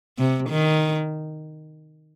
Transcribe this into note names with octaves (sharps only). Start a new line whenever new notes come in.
C3
D#3